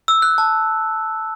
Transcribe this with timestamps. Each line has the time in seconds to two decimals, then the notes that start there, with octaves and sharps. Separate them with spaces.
0.08 E6
0.22 F#6
0.38 A5